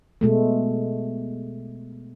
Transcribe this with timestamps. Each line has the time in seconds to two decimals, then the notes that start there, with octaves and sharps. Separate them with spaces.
0.21 B2 G#3 A3